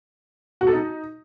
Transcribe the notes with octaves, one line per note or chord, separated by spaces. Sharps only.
F#4
A4
D#4